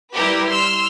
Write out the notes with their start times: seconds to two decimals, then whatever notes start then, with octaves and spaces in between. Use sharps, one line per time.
0.13 G3 E4 G4 A#4 B4
0.53 C6 E6 F6